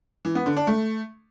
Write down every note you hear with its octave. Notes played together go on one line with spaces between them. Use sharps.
E3
B3
D3
D4
A3